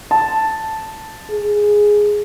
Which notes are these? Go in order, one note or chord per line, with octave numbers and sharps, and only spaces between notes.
A5
G#4